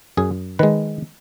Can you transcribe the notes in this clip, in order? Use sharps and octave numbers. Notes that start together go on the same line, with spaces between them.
F#2 G#4
D#3 G#3 B4